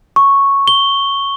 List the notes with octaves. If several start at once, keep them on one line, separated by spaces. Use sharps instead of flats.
C#6
G7